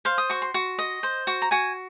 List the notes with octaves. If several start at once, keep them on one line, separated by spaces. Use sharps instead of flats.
C5 F5
D#6
F#4 C#6
C6
F#4
D#5
C5
F#4
A#5
F#4 G#5